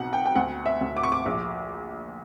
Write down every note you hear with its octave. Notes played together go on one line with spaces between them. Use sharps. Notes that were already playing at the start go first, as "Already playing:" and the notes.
Already playing: B1 B2 F#5
G5
G5
D2 F#5
E5
D2
D6
C#6
D6
A#1